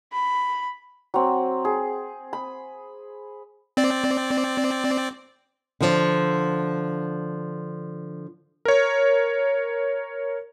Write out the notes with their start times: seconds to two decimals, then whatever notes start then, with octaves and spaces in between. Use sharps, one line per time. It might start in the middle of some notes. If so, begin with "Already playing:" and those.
0.13 B5
1.14 F#3 C4
1.65 G#4
2.33 B5
3.77 C4 D5
5.81 D3 F3
8.65 A#4 C#5